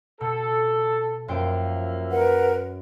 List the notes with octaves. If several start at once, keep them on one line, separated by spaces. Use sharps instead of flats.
B2 A4
F#2 F3 A#3 C5 E5 G5
A#4 B4 F#5